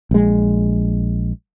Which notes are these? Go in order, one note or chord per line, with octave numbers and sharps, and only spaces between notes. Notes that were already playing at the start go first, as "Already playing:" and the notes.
A#1 G#3